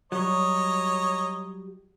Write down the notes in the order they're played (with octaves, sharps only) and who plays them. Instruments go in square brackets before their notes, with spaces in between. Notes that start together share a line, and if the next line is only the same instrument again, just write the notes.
[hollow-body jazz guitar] F#3 G3 [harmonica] C#5 D#5 A#5